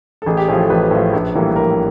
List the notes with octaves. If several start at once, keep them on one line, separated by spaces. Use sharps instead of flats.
A4
A1 G#4
G4
A2 F3 G#4
A4
A1 B4
A2 F3
A#1
A2 E3 G3 A#3
A#1 A#4